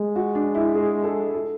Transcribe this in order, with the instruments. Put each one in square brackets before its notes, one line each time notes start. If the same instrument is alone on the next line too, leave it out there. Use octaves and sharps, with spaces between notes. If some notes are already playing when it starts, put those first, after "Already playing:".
Already playing: [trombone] G#3
[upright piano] F#4
D4
E4
G#4
A4
A4